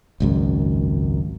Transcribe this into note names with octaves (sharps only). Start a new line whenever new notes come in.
G#1 C#2 F#2